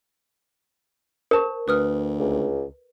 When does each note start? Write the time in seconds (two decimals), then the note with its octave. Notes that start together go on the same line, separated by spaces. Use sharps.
1.31 A#4 C5 A5 C#6
1.68 D2 B4 D#6 F6
2.19 C#2